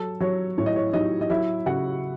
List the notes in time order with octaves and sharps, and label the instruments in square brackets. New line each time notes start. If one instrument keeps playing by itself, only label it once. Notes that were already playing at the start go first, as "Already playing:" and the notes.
Already playing: [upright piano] F#3 A4 A5
F#3 C#5
A2 C#5
D#5
C#5
F#3 D#4 D#5
D#5
F#3 E4 E5
C#3 F#4 F#5